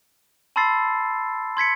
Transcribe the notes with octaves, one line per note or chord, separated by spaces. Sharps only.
A5 B5 C6 E6 A6 C7
C6 G#6 B6 C#7